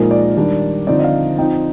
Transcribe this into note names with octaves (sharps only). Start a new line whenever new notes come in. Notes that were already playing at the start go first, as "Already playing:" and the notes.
Already playing: A#2 F3 G#3 D#4 A#4
D5
D#3 G3 D4
D3 F3 C4 D#4 D5
D#5
F5
F3 C4 D#4 G5